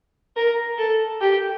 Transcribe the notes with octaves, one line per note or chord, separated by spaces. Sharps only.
A#4
A4
G4